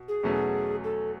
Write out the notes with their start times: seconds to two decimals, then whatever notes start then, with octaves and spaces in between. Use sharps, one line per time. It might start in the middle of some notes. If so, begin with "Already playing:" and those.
Already playing: B2
0.08 G#4
0.23 E2 B2 F#3 A3 C#4
0.84 A4